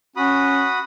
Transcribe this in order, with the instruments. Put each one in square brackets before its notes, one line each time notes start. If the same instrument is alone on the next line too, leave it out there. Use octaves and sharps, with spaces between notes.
[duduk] C#4 [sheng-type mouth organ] F#4 B5 D#6